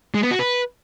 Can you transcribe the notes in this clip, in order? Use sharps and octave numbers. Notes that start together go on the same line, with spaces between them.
G#3
B3
F#4
B4